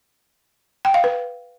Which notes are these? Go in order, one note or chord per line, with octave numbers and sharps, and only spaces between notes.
G5
F5
B4